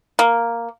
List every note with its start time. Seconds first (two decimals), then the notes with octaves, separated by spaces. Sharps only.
0.19 A#3